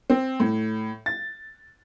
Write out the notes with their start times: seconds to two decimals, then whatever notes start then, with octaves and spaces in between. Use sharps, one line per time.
0.10 C4
0.40 A2
1.06 A6